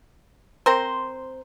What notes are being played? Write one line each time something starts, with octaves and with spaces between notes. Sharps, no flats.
C4 A#4 C5